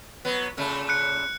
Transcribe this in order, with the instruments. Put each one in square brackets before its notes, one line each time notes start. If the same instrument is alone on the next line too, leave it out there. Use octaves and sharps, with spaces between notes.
[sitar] F#3 B3
A#2 C#3 A3
[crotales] F#6 C#7